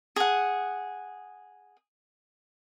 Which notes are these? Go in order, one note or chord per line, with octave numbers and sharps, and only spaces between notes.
G#4 F#5